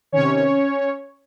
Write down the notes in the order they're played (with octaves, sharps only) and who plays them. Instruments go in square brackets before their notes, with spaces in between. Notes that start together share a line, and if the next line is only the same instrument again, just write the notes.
[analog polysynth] C3 D#3 C#4 C#5